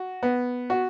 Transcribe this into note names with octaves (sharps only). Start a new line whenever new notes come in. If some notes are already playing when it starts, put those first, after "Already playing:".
Already playing: F#4
B3
F#4